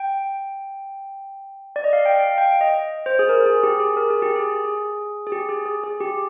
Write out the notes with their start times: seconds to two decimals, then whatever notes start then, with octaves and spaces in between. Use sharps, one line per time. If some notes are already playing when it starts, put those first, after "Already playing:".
Already playing: G5
1.76 D5
1.84 D#5
1.93 F5
2.06 G5
2.16 F5
2.38 G5
2.61 D#5
3.06 C5
3.19 G#4
3.29 A#4
3.46 G#4
3.63 G4
3.80 G#4
3.97 A#4
4.10 G#4
4.22 G4
4.36 G#4
4.64 G#4
5.27 G#4
5.32 G4
5.49 G#4
5.66 G#4
5.84 G#4
6.01 G4